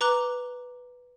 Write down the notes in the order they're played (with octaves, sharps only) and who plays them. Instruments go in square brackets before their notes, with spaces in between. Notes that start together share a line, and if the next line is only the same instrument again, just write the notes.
[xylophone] B4 A#5 D6 F#6 G7